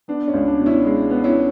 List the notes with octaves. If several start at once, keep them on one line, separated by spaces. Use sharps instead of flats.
B3 D4
C#4
C#2
D4
B2
C#4 E4
G#3
B3
C#4 E4